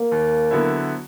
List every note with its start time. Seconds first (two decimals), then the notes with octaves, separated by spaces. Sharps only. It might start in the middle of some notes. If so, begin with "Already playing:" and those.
Already playing: A#3
0.12 D#2
0.51 D3 F#3 B3 E4